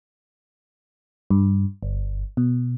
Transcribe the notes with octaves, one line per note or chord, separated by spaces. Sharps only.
G2
G1
B2